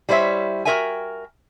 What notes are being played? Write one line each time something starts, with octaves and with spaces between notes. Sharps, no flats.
G3 E4 C5 C#5 E5
F#4 G#4 A#4 E5 G5 G#5